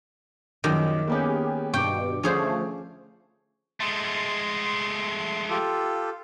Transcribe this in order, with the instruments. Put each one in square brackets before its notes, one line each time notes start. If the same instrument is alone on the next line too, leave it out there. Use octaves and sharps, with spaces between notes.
[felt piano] A#1 F#2 D6 [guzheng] D#3
[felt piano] A#3 B3 C#4 [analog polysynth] G4 G#4
[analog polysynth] G2 B2 [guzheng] G5 [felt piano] C#6 D6
[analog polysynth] D3 F3 A3 [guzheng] C#4 G#4 C5
[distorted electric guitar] G#3 A3 [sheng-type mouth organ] C6
[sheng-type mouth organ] F4 G4 A4